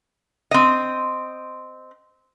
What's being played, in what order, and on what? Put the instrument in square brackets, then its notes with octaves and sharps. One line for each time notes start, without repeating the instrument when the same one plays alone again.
[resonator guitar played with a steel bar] C4 D#5